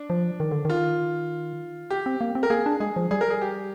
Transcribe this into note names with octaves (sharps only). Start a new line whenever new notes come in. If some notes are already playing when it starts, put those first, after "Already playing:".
Already playing: D4
F3
D#3
D3
D#3 F4
G4
C4
A#3
C4
A#4
A#3 G#4
D4
G#3 G#4
F3
G3 G#4
A#4
G#4
G4